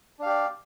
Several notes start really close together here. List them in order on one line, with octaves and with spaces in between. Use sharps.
D4 F5 G4 D5